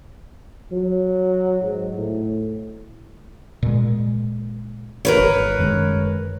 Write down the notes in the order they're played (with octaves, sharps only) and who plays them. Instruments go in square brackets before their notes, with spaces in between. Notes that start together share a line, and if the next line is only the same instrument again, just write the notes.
[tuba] F#3
G#2
A2
[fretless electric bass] A#2 G#3
[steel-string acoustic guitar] A#4 B4 C#5
[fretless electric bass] G1
F#2 D#3 G#3